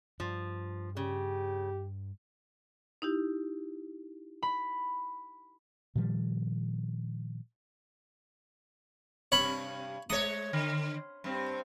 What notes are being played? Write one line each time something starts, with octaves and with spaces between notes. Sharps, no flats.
G2 F3
C#3 G4
D#4 E4 G4
B5
A#2 D#3 F3 G3
G2 C3 C#5 B5
G#3 C#5 D#6
D3
G2 C4